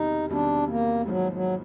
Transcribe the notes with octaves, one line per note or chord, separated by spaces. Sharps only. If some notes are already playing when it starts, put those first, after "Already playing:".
Already playing: E1 E2 C3 D#3 G3 D#4
E1 E2 C3 D#3 G3 D4
A#3
G#1 G#2 F3 F#3 A#3
F#3